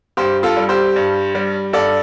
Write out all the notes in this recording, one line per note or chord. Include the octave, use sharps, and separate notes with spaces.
G2 G4 C5
F4 A4
G3
G4 C5
G2
G3
G2 A4 D5